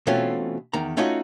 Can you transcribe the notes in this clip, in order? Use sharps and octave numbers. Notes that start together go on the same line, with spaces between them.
B2 E3 A3 C4 C#4 F4
E2 D#3 A#5
A3 C#4 D#4 F4 F#4 D#5